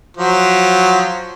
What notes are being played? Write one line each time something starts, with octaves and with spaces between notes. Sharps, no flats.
F3 F#3 C5